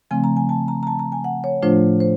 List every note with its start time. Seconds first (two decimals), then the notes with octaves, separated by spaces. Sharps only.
0.11 C#3 F3 A3 C4 G#5
0.24 A#5
0.37 G#5
0.49 A5
0.68 A#5
0.83 A#5
0.87 A5
0.99 A#5
1.12 G#5
1.24 F#5
1.44 C#5
1.62 A2 F3 A3 D4 F4 C5
2.00 C5